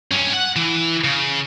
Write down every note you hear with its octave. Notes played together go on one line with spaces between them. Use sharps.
G2 C#4
F#5
E3
C#3